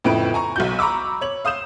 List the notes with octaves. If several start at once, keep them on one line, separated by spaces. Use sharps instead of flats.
F2 A2 C#3 E4 B4 D7
G#5 A#5 C#6
B1 F#4 G6
A#5 B5 C#6 D6 E6
C#5 F#7
F5 D#6 G6 E7